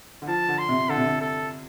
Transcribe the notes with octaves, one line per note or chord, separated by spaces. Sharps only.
D3
F3 A5
D3
C6
C3
D3 A4
C3
D3
A4